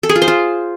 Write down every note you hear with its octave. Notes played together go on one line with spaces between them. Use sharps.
A4
G#4
F4
C5
F4